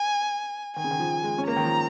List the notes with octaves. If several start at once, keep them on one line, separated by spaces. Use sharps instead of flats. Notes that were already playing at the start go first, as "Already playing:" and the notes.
Already playing: G#5
D#3 G#5
C#3
D#3
F3
G#3
C#4
A#3 A#5
D#3
F3